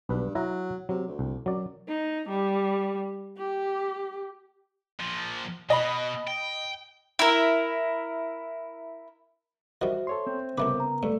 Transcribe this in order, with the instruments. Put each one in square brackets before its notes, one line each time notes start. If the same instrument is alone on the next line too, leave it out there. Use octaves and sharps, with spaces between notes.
[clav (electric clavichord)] B1 B4 [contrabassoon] G2
[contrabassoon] F#3 [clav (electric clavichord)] E4 E5 A#5
[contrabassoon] C3 [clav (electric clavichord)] F#3
[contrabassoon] D2
[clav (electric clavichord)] C2
[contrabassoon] F#2 [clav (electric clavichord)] F#3 D5
[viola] D#4
G3
G4
[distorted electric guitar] A#2 F3
[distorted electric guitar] B2 [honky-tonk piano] D#5 B5
[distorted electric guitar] G5
[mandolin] E4 A#4
[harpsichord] D#3 G3 [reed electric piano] F#4 [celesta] C5 E5
[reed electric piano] A4 C#5 C6
[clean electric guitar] C4
[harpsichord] C2 A3 B4 [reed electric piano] C#3 B3 A#4 [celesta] D6
[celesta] A#5
[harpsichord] G2 [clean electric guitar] A3 [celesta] D5